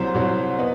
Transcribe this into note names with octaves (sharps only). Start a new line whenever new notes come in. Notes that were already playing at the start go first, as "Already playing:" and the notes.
Already playing: C2 C3 F#3 C5
C2 C3 F#3
B3 B4 D#5